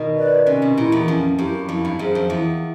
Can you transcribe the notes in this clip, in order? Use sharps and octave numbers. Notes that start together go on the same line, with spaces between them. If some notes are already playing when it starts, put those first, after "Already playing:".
Already playing: B2 D#3
B4 D5
C3 C#4
B2
A#2 E4 G4
E2
F2 C#4
F#2 E4 G4
F2 E4
G2
F#2 G#4
C5
F2
E2 E4